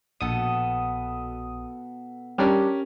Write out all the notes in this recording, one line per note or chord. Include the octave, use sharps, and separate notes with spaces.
A#1 B2 B3 A4 D#6
G3 C#4 D4 G4 A#4